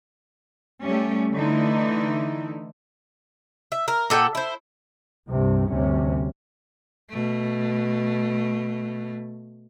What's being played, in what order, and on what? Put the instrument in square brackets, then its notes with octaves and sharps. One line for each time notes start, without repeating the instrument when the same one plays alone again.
[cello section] G3 A3 C#4 G4
D3 E3 A3 D#4 E4
[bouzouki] E5
A#4
A#2 A4 F#5 G5
E4 C5
[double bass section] C2 G2 C3
D2 G2 C3 C#4
[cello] B2 A3